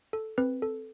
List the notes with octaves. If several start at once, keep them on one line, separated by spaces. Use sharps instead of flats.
A4
C4 B4
A4